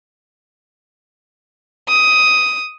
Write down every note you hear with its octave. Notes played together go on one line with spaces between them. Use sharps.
D#6